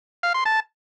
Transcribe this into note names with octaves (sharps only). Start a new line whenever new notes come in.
F5
C6
A5